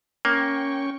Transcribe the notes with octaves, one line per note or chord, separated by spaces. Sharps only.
A#3 C#4 G5 C#6